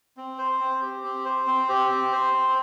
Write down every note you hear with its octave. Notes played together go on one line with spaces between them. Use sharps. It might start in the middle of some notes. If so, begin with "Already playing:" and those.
C4
C5
C4
G4
C4
C5
C4
G4
C4
C5
C4